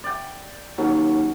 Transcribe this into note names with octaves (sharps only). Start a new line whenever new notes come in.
D5 G5
D#2 F#3 C#4